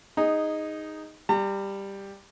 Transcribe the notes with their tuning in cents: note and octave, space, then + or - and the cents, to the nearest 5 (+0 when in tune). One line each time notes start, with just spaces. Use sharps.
D#4 +0 G#4 -15
G3 +10 A#5 -40